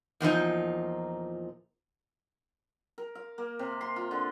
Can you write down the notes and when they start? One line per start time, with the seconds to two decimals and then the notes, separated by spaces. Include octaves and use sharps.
0.20 E2 A#2 F3 D#4
2.98 A#4
3.15 F5
3.38 A#3
3.59 C3
3.81 C6
3.96 F4
4.11 D3